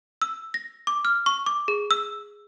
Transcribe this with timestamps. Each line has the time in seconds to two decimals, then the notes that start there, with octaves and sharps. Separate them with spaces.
0.22 E6
0.54 A#6
0.87 D6
1.05 F6
1.26 C#6
1.46 D6
1.68 G#4
1.91 E6